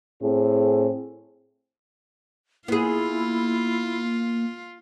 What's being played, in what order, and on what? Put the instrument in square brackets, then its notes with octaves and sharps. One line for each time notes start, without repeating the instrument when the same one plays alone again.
[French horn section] A2 C4 G#4
[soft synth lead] A#3 [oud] B3 G#4 [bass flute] E4 [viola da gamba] F4